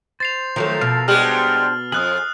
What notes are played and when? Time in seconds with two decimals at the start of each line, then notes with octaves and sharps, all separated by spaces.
0.20 C5 A6 C7 F7
0.56 D#3 F3 F#3 A3
0.81 B2 A4 A#4 F5
1.08 G3 G#3 D4 G4 C5 F#5 F6 F#7
1.92 F2 F4 G#4 D#6 F#6 F#7